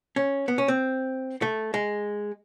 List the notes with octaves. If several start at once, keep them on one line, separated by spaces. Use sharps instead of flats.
C#4
B3
C#4
C4
A3
G#3